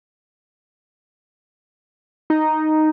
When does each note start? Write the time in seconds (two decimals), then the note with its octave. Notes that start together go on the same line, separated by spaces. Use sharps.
2.30 D#4